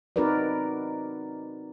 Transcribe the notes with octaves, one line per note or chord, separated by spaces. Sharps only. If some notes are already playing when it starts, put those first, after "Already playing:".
C4 D#4 F#4 A#4 B4 D5